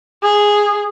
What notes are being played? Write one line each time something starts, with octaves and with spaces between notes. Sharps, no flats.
G#4